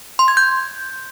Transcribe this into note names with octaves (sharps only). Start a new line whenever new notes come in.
C6
G#6
G6